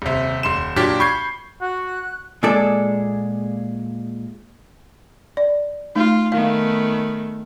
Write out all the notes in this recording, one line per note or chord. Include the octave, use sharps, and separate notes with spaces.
D#1 C3
D#1 C6 E7
A#2 F#3 D4 G4 D6
B5 C#6 G6 G#6 C7
F#4 F#6
A#2 G#3 G#4 A4 D5
D5
A3 D#4 F4
D#3 A3 B3 F5